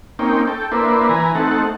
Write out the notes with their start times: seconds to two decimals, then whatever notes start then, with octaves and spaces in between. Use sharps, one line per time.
0.19 A#3 C4 C#4 D#4 G5
0.47 A4 G5
0.72 A#3 D4 E4 B4 C5
1.09 E3 B4 G#5 A#5
1.35 A3 C4 D#4 A4 F#5